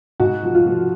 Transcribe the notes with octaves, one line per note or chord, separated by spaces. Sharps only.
G#2 F#4
F3
F4
F3